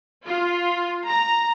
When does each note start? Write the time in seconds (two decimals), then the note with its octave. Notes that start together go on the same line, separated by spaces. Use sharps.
0.24 F4
1.07 A#5